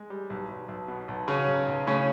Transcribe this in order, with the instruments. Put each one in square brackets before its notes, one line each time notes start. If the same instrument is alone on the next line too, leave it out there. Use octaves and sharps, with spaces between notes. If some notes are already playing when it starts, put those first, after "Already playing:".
Already playing: [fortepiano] G#3
G3
B1
B1
B1
B2
B1
C#3 F#3 C#4
B1
B1
A2 C#3 C#4